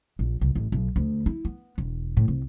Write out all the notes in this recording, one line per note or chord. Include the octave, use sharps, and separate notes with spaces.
A#1
C2
A1
B1
D2
E4
B3
E1
A2
C2